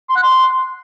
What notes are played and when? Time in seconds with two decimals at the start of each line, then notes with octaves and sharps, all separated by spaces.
0.09 C6
0.16 F#5
0.23 C6